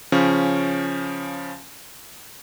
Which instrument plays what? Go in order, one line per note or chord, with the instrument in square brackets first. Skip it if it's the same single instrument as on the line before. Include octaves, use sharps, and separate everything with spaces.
[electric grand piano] C#3 F3 C#4